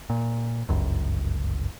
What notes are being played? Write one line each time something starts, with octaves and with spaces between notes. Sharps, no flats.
A#2
G1 C#2 F#2